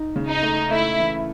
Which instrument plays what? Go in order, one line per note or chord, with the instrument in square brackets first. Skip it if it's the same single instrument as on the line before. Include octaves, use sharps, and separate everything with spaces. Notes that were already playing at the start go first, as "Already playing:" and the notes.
Already playing: [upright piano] D#4
C#3
[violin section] D#4
[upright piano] A3
[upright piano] A3 [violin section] E4
[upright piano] E3